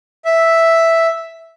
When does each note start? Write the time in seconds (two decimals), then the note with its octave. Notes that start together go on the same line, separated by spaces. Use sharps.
0.25 E5